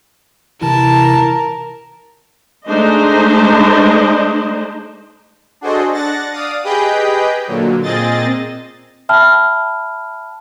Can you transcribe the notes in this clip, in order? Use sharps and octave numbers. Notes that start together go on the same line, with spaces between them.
C3 E3 E4 A#4 A5
G#3 A3 D4 D#4 C5 D#5
D4 F#4 G#4 A4 C5 D#5
D4 F#5 A6 A#6
D5 F5 D#6
G4 G#4 B4 D#5 G5 G6
A#2 D3 F#3
A#2 C4 G#4 D#5 A6
E5 G5 A5 B5 F6